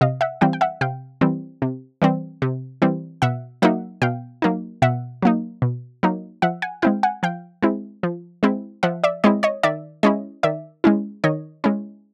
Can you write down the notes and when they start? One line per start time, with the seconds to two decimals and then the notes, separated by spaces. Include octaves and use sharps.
0.01 C3 D#5 F5
0.21 E5 F#5
0.41 E3 G3 C4 F5 G5
0.53 G5
0.61 E5 F#5
0.81 C3 F5 G5
1.21 E3 G3 C4
1.62 C3
2.02 E3 G3 C4
2.42 C3
2.82 E3 G3 C4
3.22 B2 E5 F#5
3.62 F#3 A#3 D#4 E5 F#5
4.02 B2 F5 G5
4.42 F#3 A#3 D#4
4.82 B2 E5 F#5
5.22 F#3 A#3 D#4
5.62 B2
6.03 F#3 A#3 D#4
6.42 F3 E5 F#5
6.62 F#5 G#5
6.82 G#3 C4 E4 F5 G5
7.03 F#5 G#5
7.23 F3 F5 G5
7.63 G#3 C4 E4
8.03 F3
8.43 G#3 C4 E4
8.83 F3 E5 F#5
9.04 D5 E5
9.24 G#3 C4 E4 C#5 D#5
9.43 C#5 D#5
9.63 D#3 D5 E5
10.03 G#3 C#4 E4 C#5 D#5
10.43 D#3 D5 E5
10.84 G#3 C#4 E4
11.24 D#3 C#5 D#5
11.64 G#3 C#4 E4